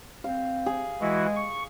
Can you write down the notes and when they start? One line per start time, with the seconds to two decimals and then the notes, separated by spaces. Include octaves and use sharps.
0.24 C4 F5
0.66 G#4
1.01 E3 G#3 E4 F#4
1.36 C#6